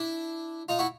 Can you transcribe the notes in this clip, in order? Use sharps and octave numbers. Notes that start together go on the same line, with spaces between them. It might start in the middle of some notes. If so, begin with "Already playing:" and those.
Already playing: D4 E4
D#4 F4
E4 F#4